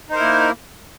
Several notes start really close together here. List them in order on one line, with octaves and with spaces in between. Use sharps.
D#4 C5 A#4 E4 A#3